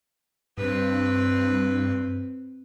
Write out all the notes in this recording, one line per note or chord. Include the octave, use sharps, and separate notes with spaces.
G2 C4 B4